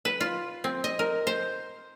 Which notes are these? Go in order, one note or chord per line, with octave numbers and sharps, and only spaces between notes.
B4
F4
C4
D#5
A#4
C5